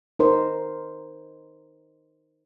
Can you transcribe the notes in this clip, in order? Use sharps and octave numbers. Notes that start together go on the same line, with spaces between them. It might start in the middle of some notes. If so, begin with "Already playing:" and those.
D#4 A#4 C5